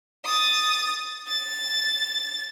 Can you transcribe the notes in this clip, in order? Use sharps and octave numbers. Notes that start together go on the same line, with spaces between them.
D#6 A6
A6